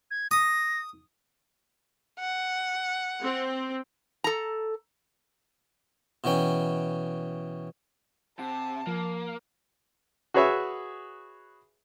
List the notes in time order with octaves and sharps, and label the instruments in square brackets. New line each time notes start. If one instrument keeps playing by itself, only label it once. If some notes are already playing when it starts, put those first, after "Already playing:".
[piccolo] G#6
[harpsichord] D#6 [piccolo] A#6
[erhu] F#5
[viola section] C4
[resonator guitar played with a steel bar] A4 A#5
[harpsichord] B2 E3 C#4 G5
[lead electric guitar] C3 [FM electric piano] F#5 [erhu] A5
[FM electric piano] F3 [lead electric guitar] A#3
[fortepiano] F#4 G#4 B4 C#5 E5